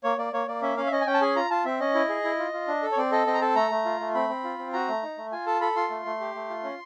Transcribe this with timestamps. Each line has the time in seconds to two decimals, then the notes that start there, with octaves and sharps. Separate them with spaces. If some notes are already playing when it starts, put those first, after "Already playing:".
0.04 A#3 C#5
0.18 A#3 D5
0.33 A#3 C#5
0.48 A#3 D5
0.62 C#4 E5
0.77 C#4 F5
0.87 E5
0.92 C#4 D#5
1.01 G#5
1.06 C#4 G5
1.14 A5
1.21 G#4 G#5
1.36 F4 A#5
1.50 F4 A5
1.65 C4 E5
1.80 C#4 D#5
1.95 E4
2.09 G#4
2.24 E4
2.39 F4
2.53 F4
2.68 D4
2.83 A4
2.92 C#5
2.97 C4 D5
3.12 A4 D#5
3.27 C4 D#5
3.34 A#5
3.41 A4 A5
3.56 A3 A#5
3.71 A3
3.85 F4
4.00 A3
4.15 C4 B5
4.29 C4
4.44 F4
4.58 C4
4.73 F#4 A#5
4.88 A3
5.03 D#4
5.18 A3
5.32 F4 G#5
5.46 A4 A5
5.61 A4 B5
5.76 F4 C6
5.90 A3
6.05 A3
6.20 G4
6.35 A3
6.50 F4
6.64 C#4